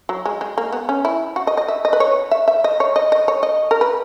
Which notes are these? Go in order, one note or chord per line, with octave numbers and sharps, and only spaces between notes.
F#3
G#3
G#3
A#3
B3
C#4
E4
F#4
D#5
D#5
E5
D#5
B4
C#5
E5
E5
D#5
C#5
D#5
D#5
C#5
D#5
A#4
B4